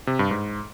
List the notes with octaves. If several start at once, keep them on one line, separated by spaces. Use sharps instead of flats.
C3
G2
G#2